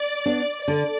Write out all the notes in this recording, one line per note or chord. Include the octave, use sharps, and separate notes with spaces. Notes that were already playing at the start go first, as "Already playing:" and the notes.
Already playing: D5
B3 D4
D3 D5